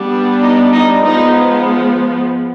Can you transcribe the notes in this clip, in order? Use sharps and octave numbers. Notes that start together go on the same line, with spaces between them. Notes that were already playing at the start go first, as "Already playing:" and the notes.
Already playing: G3 B3 D4
D#4
D#4
F3 G#3 B3 D#4